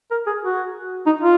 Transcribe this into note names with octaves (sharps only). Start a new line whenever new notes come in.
A#4
G#4
F#4
D#4
F4